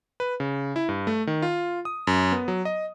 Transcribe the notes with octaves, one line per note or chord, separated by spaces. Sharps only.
B4
C#3
E4
G2
A3
D#3
F4
D#6
F#2
B3
F#3
D#5